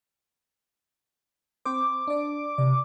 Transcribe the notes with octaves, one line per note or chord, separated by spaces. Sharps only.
C4 C5 D6
D4 D5
C3 D5